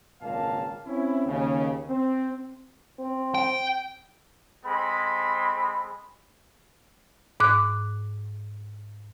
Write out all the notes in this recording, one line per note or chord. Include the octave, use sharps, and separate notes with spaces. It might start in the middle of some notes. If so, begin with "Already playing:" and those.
G#1 C#2 A#2 A#3 F5 A5
C4 C#4 E4
D#2 C#3
C4
C4
G5
G#3 C4 A4 B5
G#2 D6 F#6